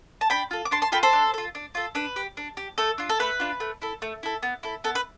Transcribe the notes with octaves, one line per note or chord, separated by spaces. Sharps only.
A5
D4 G5 B5
F4 A4
D6
D4 A5 C6
A5 C6
F4 A4 G5 B5
A4 C5
D4
F4 A4
D4
F4 A4
D4 B4
G4
D4
G4
A3 A4
D4 F4
A4
A3 B4
D4 F4
A3
E4 A4
A3
E4 A4
B3
E4 A4
B3 A4
B4